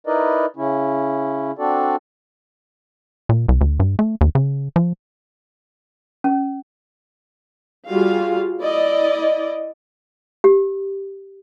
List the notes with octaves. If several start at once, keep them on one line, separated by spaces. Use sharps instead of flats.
D#4 E4 A#4 B4 D5 D#5
C#3 C#4 E4
C4 D4 F#4 A4 D5
A#2
C2
D2
G2
A3
D#2
C#3
F3
C#4
G3 F4 F#4 G#4 F5
E4 D5 D#5
G4